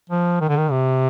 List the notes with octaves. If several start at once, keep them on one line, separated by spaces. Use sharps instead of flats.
F3
D#3
D3
D#3
C3